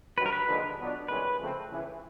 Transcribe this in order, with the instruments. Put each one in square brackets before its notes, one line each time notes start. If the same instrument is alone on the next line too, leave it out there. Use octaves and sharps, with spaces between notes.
[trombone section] G2 D#3 F#3 [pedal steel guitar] B4
[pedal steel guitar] A#4
B4
[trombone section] D#2 D3 F3 G#3
B2 F#3 B3 D4 F4
[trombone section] C2 C3 D#3 G#3 C#4 [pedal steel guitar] B4
[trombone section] C#3 F3 A3 C4
D#2 C#3 E3